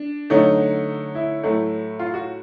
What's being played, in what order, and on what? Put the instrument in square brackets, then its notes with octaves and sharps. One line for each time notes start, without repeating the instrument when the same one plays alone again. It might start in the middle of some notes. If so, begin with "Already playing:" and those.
Already playing: [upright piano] D4
D3 F#3 A3 D#4
E4
A2 F#3 A3
F4
F#4